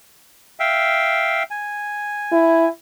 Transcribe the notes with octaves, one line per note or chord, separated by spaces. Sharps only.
E5 F5 G5
G#5
E4